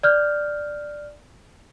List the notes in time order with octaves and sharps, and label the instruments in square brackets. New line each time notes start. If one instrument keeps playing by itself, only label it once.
[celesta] D5 F6 G6